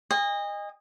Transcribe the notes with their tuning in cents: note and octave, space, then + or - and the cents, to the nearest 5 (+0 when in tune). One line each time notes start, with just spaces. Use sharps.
D#5 -10 G#5 -40